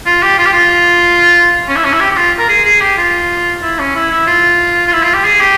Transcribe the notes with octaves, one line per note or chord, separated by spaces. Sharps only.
F4
G4
F4
G4
F4
C#4
E4
C#4
E4
G4
G4
F4
A#4
G#4
G#4
G4
F4
E4
C#4
E4
E4
F4
F4
E4
F4
G4
G#4
G4